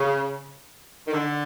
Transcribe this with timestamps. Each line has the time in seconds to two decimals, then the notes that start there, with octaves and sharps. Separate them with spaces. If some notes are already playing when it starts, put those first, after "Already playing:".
Already playing: C#3
1.07 D#3
1.13 D3